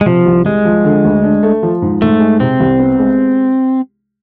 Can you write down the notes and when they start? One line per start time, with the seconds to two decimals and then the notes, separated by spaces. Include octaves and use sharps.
0.01 G#3
0.06 C3 F3
0.26 C2
0.45 C2 G#3
0.65 F3
0.84 D3
1.04 D2
1.24 D4
1.43 A3
1.63 F3
1.82 G#2
2.02 G#2 A3
2.20 G#3
2.40 C3 C4
2.60 C2
2.80 B3
2.99 G#3